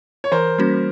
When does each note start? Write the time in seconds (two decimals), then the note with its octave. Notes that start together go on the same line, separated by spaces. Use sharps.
0.24 C#5
0.32 E3 A#4 C5
0.58 G3 A#3 C#4 F#4